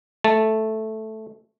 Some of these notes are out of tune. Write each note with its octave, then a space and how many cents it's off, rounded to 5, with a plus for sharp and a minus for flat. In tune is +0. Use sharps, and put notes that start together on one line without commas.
A3 -5 A5 +0